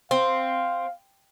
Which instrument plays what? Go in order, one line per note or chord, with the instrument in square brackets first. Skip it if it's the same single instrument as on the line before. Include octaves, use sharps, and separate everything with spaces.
[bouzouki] C4 [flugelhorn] F5